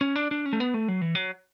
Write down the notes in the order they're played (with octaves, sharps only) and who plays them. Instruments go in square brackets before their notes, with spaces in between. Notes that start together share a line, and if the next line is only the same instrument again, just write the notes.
[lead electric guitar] C#4
D4
D4
C#4
A3
B3
A3
F#3
E3
F#3